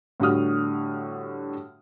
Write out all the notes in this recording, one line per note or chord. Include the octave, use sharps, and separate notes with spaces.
A2 D3 G3 F#4 D#6 F6